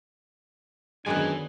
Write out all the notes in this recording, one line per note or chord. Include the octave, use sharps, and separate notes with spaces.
F#2 D3 D#3 G#3 B3 D4 B4 G#5